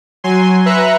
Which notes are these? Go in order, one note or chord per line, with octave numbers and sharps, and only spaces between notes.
F#3 G#5 C6
B4 E5 A#5 F#6 C#7